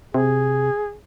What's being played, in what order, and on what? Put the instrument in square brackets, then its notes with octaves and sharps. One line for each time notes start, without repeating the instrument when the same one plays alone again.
[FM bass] C3 [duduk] G#4